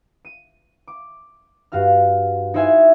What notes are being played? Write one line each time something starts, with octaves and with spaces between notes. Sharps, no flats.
D#7
D6
G2 F#4 F5 F6
D#4 E4 C5 E5 F#5 G#5